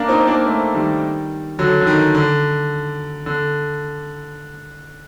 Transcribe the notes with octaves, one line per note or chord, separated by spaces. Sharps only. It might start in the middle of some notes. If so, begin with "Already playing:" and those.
Already playing: A#3 D4
C4 D#4
C4
A#3 D4
A3 C4
D#3 G3
D3 F#3
D3
D#3
D3
D3